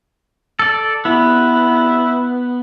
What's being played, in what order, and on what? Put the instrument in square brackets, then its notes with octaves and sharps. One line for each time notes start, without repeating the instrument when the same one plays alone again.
[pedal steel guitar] A4 D5
[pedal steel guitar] B3 [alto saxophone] E4